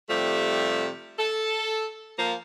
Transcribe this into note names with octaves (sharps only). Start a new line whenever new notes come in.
C3 F3 G3 A3
A4
F3 A#3